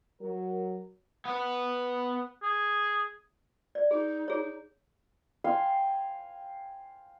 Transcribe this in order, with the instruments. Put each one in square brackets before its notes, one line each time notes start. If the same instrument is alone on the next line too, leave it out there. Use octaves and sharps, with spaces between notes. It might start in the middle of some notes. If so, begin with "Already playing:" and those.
[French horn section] F#3 A#4
[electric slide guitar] B3 B4
[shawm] G#4
[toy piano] D5
[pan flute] D#4 [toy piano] G#4
[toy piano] G#4 C#5
[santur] F5 G5 G#5 C6